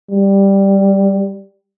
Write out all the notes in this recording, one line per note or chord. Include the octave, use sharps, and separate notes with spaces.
G3